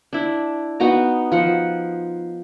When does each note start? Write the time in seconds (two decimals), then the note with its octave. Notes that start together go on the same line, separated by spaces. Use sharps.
0.13 D4 E4
0.80 B3 D#4 F#4 A#5
1.32 F3 F#5